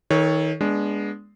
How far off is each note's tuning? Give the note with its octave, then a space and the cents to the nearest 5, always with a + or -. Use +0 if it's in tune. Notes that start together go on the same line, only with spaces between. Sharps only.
D#3 +30 A4 +0 C#5 +0
G#3 +0 B3 -25 D4 -15